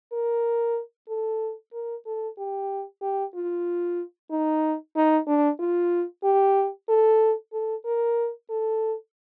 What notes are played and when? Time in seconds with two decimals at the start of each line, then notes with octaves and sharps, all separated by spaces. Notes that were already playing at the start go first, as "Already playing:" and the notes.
0.13 A#4
1.08 A4
1.73 A#4
2.06 A4
2.38 G4
3.02 G4
3.35 F4
4.31 D#4
4.96 D#4
5.27 D4
5.60 F4
6.24 G4
6.89 A4
7.53 A4
7.85 A#4
8.50 A4